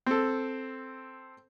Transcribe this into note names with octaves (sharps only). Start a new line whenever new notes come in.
C4 A4